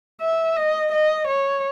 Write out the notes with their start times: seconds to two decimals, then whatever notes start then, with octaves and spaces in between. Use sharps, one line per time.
0.21 E5
0.57 D#5
0.92 D#5
1.28 C#5